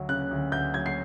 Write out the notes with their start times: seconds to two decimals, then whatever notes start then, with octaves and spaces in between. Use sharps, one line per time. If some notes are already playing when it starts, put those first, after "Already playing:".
Already playing: D2 F#3
0.09 C#3 F#6
0.31 D2
0.52 D2 G6
0.74 F#3 G#6
0.86 C7